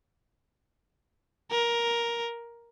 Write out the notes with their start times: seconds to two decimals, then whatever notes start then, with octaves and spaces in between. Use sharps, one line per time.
1.51 A#4